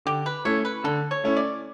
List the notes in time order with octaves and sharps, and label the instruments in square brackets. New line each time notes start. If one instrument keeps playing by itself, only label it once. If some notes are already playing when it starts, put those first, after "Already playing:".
[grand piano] D3 [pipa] G4
[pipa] B4
[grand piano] A3 C#4 E4 [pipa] C#5
[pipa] B4
[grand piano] D3 [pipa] A4
[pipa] C#5
[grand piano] A3 C#4 E4
[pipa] D5